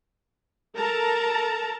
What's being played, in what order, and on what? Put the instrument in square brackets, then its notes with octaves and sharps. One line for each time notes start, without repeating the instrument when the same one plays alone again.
[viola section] A4 A#4 A5 A#5